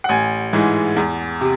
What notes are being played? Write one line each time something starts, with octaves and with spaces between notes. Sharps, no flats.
F#5
A1 G#5
G#2 E3 G#3
E2
C3